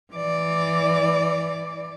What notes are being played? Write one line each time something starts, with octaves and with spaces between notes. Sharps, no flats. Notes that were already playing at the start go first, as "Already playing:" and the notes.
E3 D5